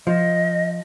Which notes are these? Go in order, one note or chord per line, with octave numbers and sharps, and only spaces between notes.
F3 D#5